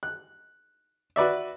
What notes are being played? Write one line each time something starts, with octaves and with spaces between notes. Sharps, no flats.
F#6
F#4 B4 D5 E5